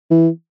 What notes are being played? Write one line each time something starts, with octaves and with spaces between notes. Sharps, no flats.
E3